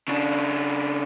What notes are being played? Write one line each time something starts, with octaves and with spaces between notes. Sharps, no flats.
C#3 D4